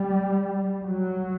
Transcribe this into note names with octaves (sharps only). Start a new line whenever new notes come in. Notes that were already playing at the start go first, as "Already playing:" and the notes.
Already playing: G3
F#3